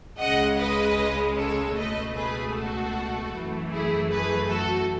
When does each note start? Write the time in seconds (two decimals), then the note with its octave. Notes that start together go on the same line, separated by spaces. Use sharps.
0.19 C#2 C#3 G#3 D#5 F#5
0.58 B4 D#5
1.37 A4 C#5
1.76 C#2 B2 A3 B4 D#5
2.15 G#4 B4
2.54 F#4 A4
3.33 F#2 E3 A3
3.71 E4 G#4
4.11 G#4 B4
4.50 F#4 A4